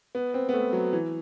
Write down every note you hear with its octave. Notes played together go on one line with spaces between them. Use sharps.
B3
C4
B3
A3
F#3
E3